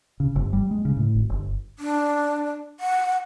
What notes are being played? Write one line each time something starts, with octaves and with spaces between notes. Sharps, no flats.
C#3
G1
G3
G#3
C#3
A2
G#1
G1
D4
F#5